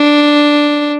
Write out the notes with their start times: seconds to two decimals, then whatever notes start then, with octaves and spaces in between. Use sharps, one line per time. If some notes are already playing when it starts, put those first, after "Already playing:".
Already playing: D4